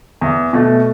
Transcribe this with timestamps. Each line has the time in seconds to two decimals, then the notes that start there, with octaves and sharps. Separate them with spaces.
0.21 E2
0.53 B2 A3